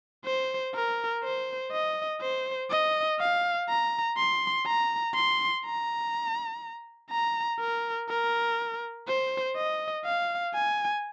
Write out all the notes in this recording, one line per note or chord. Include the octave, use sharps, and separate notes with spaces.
C5
A#4
C5
D#5
C5
D#5
F5
A#5
C6
A#5
C6
A#5
A#5
A#4
A#4
C5
D#5
F5
G#5